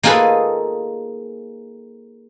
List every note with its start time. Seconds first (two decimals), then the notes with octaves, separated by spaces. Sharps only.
0.03 A#3 D#4 F4 G#4 A4 B4